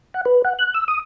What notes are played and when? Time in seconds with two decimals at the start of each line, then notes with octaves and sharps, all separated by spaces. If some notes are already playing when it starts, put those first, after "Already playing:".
0.14 F#5
0.25 B4
0.45 F#5
0.59 F#6
0.74 E6
0.88 D#6